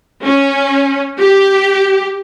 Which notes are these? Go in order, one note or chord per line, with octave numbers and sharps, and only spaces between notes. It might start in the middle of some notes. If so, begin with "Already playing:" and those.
C#4
G4